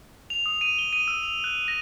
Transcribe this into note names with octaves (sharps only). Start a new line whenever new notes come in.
F7
D#6
D#7
G7
D#7
E6
F7
F#6
A#6